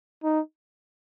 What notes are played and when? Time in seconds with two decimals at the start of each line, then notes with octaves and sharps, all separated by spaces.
0.24 D#4